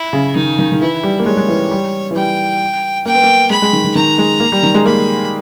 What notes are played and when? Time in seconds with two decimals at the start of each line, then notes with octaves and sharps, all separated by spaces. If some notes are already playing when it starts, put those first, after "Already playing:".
Already playing: E4
0.13 C#3
0.36 D#3 D#4
0.59 D#3
0.72 D#3
0.81 E3 E4
1.03 G3
1.19 A#3
1.26 G#3 C#5
1.37 G#3
1.48 E3
1.71 G3
2.11 E3
2.16 G3 G5
3.06 A#3 G5
3.14 B3
3.23 A#3
3.50 G#3 B5
3.62 G#3
3.73 D#3
3.84 D#3
3.95 D#3 A#5
4.18 G#3
4.40 A#3
4.52 G3
4.63 D#3
4.74 G#3
4.86 A#3 B5